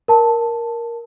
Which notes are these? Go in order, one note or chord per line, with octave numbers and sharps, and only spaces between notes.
A#4 A5